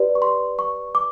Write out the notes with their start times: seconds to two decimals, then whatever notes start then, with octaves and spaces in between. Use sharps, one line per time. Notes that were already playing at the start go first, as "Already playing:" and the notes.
Already playing: G4 B4 D5
0.15 C#6
0.22 C6
0.59 C#6
0.95 D6